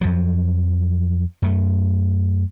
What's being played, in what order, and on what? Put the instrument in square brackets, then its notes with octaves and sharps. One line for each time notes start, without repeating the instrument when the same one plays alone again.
[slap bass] F2 F3 F#3
F#2 A3